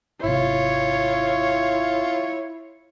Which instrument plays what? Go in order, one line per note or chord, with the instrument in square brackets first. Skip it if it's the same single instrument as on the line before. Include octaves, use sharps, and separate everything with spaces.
[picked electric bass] G#1 C3 [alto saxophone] E4 [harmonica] F4 [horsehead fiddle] C#5